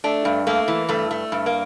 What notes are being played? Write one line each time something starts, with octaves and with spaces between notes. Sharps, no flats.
A3 D4
G2
A3 A#3
E3
G2 A3
A3
G2
A#3